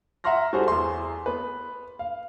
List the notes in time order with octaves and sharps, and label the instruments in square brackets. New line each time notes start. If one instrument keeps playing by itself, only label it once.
[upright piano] E5 F#5 A#5 C6 F6 A#6
G3 F#4 G#4 A4 C5
E2 C6
B3 B4
F5